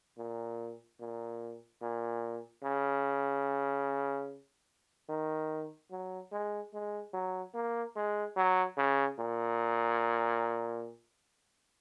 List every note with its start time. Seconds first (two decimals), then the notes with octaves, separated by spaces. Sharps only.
0.18 A#2
1.00 A#2
1.82 A#2
2.64 C#3
5.09 D#3
5.91 F#3
6.32 G#3
6.73 G#3
7.14 F#3
7.54 A#3
7.96 G#3
8.36 F#3
8.78 C#3
9.19 A#2